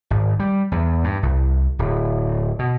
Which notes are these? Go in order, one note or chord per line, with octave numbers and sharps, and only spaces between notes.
G#1
G3
E2
G2
C2
D1
B2